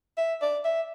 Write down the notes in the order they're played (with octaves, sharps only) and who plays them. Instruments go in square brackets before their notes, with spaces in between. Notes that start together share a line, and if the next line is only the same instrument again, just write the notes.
[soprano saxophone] E5
D5
E5